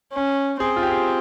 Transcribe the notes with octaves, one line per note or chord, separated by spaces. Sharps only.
C#4
C4 G#4
F4
G4
G#4